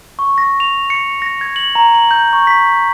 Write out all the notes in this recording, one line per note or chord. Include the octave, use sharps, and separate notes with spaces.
C#6
A#6
F7
C#7
A#6
G#6
F#7
A#5
F#7
G6
C#6
B6